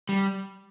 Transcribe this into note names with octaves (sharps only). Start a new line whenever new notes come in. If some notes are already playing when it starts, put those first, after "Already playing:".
G3